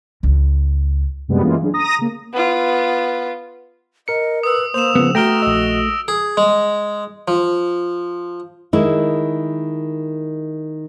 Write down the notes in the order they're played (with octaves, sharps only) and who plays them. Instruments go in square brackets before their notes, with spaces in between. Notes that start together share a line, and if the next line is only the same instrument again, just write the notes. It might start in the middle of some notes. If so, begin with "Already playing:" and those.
[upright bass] C#2
[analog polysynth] F#2 C3 G3 G#3 B3
E3 G#3 A#3 C#4 F4
F#3 D4 G#4
A#5 D#6 A#6
C#3 A#3
[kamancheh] B3 F4
[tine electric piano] A#4 C#7 [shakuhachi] D#5
[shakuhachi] B4 [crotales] D#6 E6
[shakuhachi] A#3 [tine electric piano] C5 [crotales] E7 F7
[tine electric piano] C#3 F3 [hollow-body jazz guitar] B3
[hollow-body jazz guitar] A3 [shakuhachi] F#4 [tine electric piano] G5 A#5 F6 [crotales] A#6 D7 G7
[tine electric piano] A#1 D#5 [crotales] E6
[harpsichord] G#4
G#3
F3
[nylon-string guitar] D#3 G#3 E4